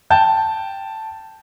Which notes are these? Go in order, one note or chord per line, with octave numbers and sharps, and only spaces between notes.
G5 A5 G6